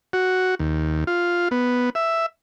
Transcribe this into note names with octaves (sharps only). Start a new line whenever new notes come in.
F#4
D#2
F4
B3
E5